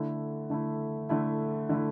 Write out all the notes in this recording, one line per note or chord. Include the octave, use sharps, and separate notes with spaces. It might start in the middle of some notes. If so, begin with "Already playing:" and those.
Already playing: D3 A3 E4
D3 A3 E4
D3 A3 E4
D3 A3 E4